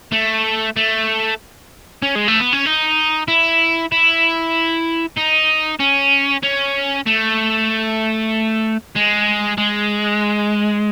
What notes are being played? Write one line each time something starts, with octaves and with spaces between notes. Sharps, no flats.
A3
A3
C#4
G#3
A3
B3
C#4
D#4
E4
E4
D#4
C#4
C#4
A3
G#3
G#3